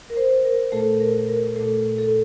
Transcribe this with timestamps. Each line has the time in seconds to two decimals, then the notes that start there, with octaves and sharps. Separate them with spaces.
0.10 A#4
0.17 C5
0.45 A#4
0.72 A#2 A3 A4
1.00 A#4
1.28 A#4
1.56 A#2 A3 A4
1.98 A4